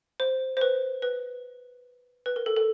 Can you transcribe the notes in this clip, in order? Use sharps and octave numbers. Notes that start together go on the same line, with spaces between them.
C5
C5
B4
B4
B4
A#4
A4
A4